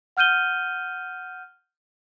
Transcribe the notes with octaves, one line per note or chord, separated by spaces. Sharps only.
F#5 F6 G6 D#7 G7